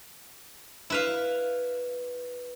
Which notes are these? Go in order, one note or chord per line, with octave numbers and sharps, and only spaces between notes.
E4 B4 F5